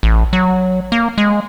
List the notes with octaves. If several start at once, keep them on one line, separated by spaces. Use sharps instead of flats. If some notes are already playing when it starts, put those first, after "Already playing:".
A1
F#3
A#3
G#3